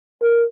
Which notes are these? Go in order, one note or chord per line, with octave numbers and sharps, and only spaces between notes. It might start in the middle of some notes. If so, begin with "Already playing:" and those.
A#4